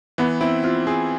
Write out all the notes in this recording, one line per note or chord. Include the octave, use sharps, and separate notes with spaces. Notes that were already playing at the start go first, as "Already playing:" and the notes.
E3 B3
C4 E4
C4 F4
C4 G#4